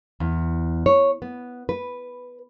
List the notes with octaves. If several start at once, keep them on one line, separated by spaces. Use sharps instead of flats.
E2
C#5
B3
B4